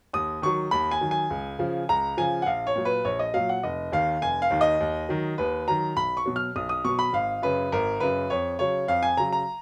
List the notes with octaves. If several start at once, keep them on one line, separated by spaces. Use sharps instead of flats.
D#2 D#6
D#3 F#3 C#6
D#2 B5
G#5
D#3 F#3
G#5
C#2
C#3 F3
C#2 A#5
C#3 F3 G#5
F#5
A#1 F5
C#5
A#2 F#3
B4
A#1 C#5
D#5
A#2 F#3 F5
F#5
F1 D#5
D#2 D#3 F5
F1 G#5
F5
D#2 D#3
D#5
D#2
D#3 F#3
D#2 B4
D#3 F#3 A#5
B1 B5
C#6
B2 F#3
F6
B1 D#6
D#6
B2 F#3 C#6
B5
G#1 F5
F#2 C#3 B4
G#1 A#4
F#2 C#3 B4
F2 C#5
C#3 F#3 C#5
F2 F5
G#5
C#3 F#3 A#5
A#5